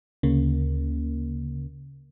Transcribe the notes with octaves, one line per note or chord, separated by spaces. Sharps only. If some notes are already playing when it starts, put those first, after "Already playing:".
D2 C#3 A#3